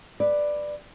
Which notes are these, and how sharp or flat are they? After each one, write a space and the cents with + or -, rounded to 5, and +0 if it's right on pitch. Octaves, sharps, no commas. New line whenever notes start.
B4 +0 D5 +10